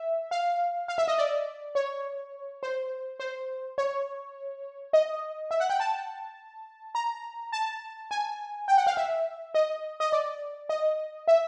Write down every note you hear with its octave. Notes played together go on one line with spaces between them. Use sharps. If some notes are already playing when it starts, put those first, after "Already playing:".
Already playing: E5
F5
F5
E5
D#5
D5
C#5
C5
C5
C#5
D#5
E5
F#5
G5
A5
A#5
A5
G#5
G5
F#5
F5
E5
D#5
D#5
D5
D#5
E5